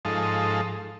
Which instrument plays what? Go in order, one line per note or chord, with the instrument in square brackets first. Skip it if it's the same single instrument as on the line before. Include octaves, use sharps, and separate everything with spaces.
[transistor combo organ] G#2 F3 D#4 A4